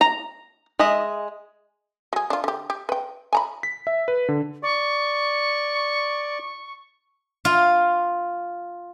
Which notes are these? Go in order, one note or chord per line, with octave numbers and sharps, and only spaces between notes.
A#5
G#3 D#5 E5
F#3 G#4
D4 F4
D3 G4
G4
B4 G5
G#5 A#5 B5
B6
E5
B4
D3
D5 C#6
F4